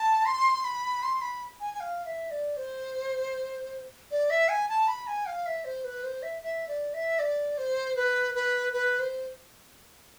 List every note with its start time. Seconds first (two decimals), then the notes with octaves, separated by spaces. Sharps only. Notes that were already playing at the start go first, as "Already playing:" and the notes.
Already playing: A5
0.26 C6
0.64 B5
1.03 C6
1.21 B5
1.60 G#5
1.74 G#5
1.80 F5
2.05 E5
2.31 D5
2.57 C5
4.11 D5
4.30 E5
4.49 G#5
4.69 A5
4.87 B5
5.07 G#5
5.26 F5
5.46 E5
5.65 C5
5.84 B4
6.03 C5
6.23 E5
6.42 E5
6.68 D5
6.94 E5
7.19 D5
7.58 C5
7.96 B4
8.35 B4
8.73 B4
8.99 C5